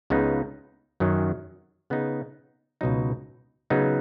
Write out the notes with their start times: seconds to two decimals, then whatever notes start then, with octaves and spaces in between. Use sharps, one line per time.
0.10 C#2 C#3 B3 D#4
1.00 F#2 D#3 F#3 C#4
1.90 C#3 B3 D#4
2.81 C#2 B2 F#3 D#4
3.70 C#3 F#3 B3 D#4